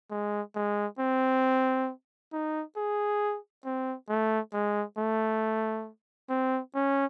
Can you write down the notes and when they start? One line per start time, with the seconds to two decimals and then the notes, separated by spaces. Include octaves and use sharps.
0.11 G#3
0.55 G#3
0.99 C4
2.33 D#4
2.76 G#4
3.65 C4
4.09 A3
4.53 G#3
4.97 A3
6.29 C4
6.75 C#4